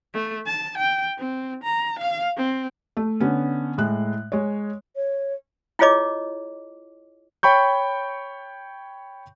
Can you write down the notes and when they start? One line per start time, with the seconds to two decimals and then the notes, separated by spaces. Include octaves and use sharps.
0.14 A3
0.46 A5
0.78 G5
1.18 C4
1.64 A#5
1.99 F5
2.37 C4
2.97 A3
3.20 D3 B3 C#4
3.78 A2 G#3 F#6
4.32 G#3 C#5
4.96 C#5
5.79 E4 F4 G#4 C#5 D#5 D6
7.43 C#5 G5 B5 C#6 G6